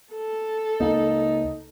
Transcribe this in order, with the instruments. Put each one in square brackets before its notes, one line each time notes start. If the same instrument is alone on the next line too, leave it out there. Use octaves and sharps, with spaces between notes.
[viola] A4
[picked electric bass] C#2 A#3 [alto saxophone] D#4